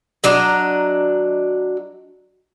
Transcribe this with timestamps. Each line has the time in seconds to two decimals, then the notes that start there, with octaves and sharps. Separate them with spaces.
0.24 F#3 D4 D#5 A#5